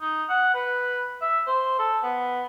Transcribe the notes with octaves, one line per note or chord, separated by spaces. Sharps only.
D#4
F#5
B4
E5
C5
A4
B3